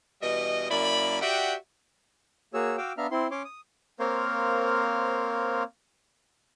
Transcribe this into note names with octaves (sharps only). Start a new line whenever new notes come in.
B2 E3 G3 D#5
F#2 A#3 E4 D5 B5
F#4 G4 D5 E5 F#5 G5
A#3 F#4 G#4 C#5 E6
F#4 F5 G5 D6 E6
B3 D4 E5 F5 A#5 F6
C4 E4 C6
C#4 C#5 C6 D6
D#6
A#3 C4 A#4 C5 C#5 F5